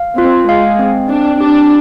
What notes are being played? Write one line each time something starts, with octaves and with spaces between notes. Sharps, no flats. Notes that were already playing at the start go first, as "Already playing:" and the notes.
Already playing: F5
C4 F4
G#3 F5
C4
C4 D4
D4 G4